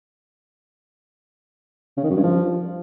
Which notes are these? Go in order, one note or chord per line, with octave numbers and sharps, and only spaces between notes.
C#3
D#3
F#2
G2
F3